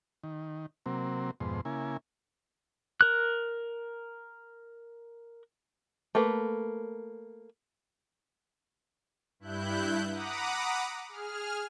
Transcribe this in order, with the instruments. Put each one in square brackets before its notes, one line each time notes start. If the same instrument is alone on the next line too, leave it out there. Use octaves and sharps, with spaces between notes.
[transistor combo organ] D#3
C3 F#3 A#3 C4
F2 G#2 B2 C5
C#3 A#3 E4 G#5
[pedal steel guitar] A#4 F#6
[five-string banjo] A3 A#3 B4
[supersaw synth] G2 E4 F#6 G6
F#5 A#5 B5 D6 D#6
G#4 F6